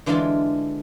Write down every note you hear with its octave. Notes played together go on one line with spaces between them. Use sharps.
D3 E3 G#3 D4 F4 A4